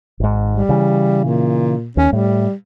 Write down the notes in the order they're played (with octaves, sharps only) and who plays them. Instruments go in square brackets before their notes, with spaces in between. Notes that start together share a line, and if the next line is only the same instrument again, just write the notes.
[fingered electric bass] G#1 G#2
[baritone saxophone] G3
[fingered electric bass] C#3 E3
[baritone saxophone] A#2
[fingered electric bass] D#2 [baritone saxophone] C#4
[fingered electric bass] A2 [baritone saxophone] G3